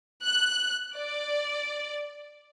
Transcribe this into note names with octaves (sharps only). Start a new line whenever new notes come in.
F#6
D5